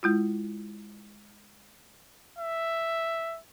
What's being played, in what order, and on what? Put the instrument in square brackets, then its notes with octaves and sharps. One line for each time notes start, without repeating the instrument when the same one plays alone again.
[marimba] G#3 E4 F4
[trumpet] E5